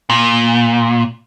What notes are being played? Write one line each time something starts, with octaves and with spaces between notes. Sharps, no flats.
A#2